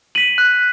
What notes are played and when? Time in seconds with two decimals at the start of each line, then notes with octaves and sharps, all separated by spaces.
0.15 B6 D#7 F#7
0.38 F#6